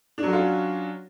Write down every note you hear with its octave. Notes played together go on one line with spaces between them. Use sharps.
F#3 C#4 D4 F4 F#4